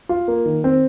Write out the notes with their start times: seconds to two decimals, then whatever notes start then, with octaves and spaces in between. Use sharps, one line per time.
0.09 F4
0.28 A#3
0.45 D#3
0.64 C4